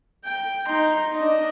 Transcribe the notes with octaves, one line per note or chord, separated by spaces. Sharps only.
G5
D#4 C6
D4 D#5